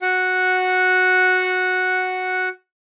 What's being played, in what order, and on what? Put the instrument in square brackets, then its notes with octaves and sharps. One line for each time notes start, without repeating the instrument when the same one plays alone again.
[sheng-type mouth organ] F#4 F#5